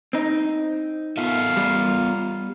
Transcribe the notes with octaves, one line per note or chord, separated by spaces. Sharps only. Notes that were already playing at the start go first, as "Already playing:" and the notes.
C4 D#4
B3 F4 A4 E5
G3